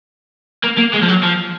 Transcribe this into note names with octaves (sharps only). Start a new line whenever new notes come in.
A#3
A#3
G#3
F3
F#3
F3